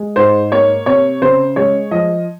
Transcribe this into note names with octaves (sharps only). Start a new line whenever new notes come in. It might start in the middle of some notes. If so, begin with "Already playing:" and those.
Already playing: G#3
G#2 C5
A#3 C#5
C3 C#5
C#3 C5
G#3 C#5
F3 D#5